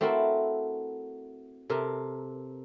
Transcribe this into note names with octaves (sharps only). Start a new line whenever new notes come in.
A3 C4 E4 F#4 A4 A#4
C3 A4 A#4